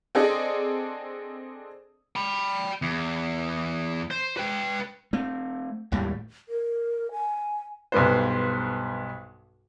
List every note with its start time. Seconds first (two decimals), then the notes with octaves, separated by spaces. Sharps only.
0.15 C4 D4 G#4 A4 D5 D#5
2.16 G5 B5
2.82 E2
4.11 C5
4.37 B4 G5
5.13 A3 C4
5.92 G#1 D#2 A2 G3
6.49 A#4
7.12 G#5
7.92 B1 G2 B3 C5